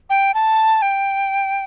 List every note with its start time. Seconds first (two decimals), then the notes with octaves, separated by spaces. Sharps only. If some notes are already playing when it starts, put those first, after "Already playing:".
0.10 G5
0.34 A5
0.82 G5